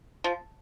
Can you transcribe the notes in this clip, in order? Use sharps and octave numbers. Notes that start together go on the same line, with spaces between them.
F3